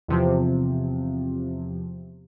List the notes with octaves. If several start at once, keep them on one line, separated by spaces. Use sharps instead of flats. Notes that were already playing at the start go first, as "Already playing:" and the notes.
E2 C3 F3